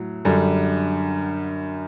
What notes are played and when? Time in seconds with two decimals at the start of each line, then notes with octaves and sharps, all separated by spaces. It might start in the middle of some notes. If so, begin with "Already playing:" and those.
Already playing: A2 F#3
0.25 F#2 D3 G3